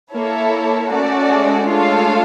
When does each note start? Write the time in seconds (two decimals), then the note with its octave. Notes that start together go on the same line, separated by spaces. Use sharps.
0.13 A#3 E4 A4 C#5
0.52 A#3
0.90 A3 C#4 F#4 A4 D5
1.30 G#3
1.68 D4 F4 A4 C#5 F5